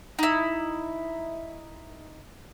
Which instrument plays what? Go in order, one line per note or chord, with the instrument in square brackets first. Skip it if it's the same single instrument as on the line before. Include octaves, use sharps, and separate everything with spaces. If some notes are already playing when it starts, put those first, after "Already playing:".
[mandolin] D#4 E4